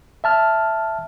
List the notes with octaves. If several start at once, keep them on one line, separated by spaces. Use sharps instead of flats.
E5 A5 F6